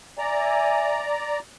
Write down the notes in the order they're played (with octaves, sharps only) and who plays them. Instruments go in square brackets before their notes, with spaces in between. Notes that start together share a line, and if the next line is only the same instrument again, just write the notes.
[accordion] D5 A#5 [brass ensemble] E5 G#5